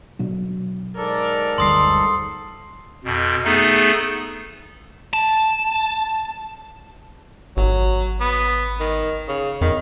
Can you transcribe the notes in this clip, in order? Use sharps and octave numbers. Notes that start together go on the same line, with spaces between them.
B2 F#3 D4
G#2 A4 A#4 D5
F#1 D2 G3 C6 D#6 C7
F2 B2
A3 B3 D#4 G#4 A4
A5
G#1 F#3
B3
D#3
C#3
F2 D#3